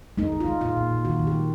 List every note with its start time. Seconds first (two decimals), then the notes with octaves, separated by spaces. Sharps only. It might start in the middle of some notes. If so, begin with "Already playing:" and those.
0.17 G#3 D#4
0.32 G#3
0.40 F4
0.48 G#3
0.61 A#2 F4
0.77 A#2
0.91 A#2
1.05 D#3 F#4
1.19 D#3
1.27 G4
1.34 G#3